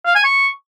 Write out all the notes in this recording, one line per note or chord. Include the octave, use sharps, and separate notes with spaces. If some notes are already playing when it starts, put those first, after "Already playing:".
F5
G#5
C#6